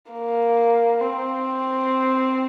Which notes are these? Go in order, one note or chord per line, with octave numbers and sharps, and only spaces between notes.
A#3
C4